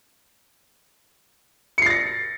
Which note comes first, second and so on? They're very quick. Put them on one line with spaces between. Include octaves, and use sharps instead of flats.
C#7 C7 A6 A#6